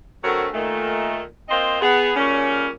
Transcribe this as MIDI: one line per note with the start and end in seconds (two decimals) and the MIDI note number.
0.23 0.47 50
0.23 0.47 54
0.23 0.47 57
0.23 0.47 60
0.23 0.47 70
0.23 0.47 73
0.53 1.21 46
0.53 1.21 51
0.53 1.21 57
1.49 1.81 58
1.49 1.81 60
1.49 1.81 65
1.49 1.81 72
1.49 1.81 75
1.81 2.11 59
1.81 2.11 68
2.16 2.68 46
2.16 2.68 49
2.16 2.68 55
2.16 2.68 61